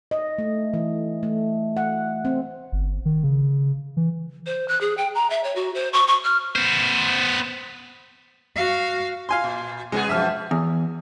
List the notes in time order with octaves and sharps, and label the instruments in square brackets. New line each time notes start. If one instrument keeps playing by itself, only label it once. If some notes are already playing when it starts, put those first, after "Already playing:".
[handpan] D#5
A3
E3
A3
F#5
C4
[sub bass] G1
D#3
C#3
E3
[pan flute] C5
F#6
G#4
G5
A#5
E5
C#5
F#4
C5
C#6
C#6
F6
[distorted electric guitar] B3 C5
[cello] F#4 F5
[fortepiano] F5 G#5 C6
[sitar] A#2
[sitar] C3 B3 G#4 [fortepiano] G#3
[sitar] F#2 B2 F3 [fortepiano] E5 F6
[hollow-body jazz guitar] E2